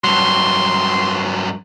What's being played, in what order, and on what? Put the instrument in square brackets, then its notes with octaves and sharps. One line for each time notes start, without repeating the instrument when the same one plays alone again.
[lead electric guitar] G2 F#3 [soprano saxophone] C6